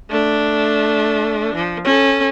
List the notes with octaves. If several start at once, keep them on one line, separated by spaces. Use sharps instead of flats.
A3 D4
F3
C#4 A4